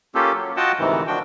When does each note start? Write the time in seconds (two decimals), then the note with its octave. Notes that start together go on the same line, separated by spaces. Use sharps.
0.15 A#3 C#4 F4 G4 A4
0.34 F#3
0.57 F4 F#4 D#5 F#5 G5 A5
0.79 D2 G#2 C3 D#3 E3
1.07 D#3 F3 D4 F#4 G5